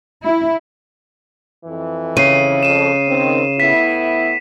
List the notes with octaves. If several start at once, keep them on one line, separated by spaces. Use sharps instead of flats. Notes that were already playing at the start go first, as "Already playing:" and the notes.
E4
F2 E3
C#3 C7 D#7
F2 D#7 E7
D#3 C4
A2 B3 E4 B6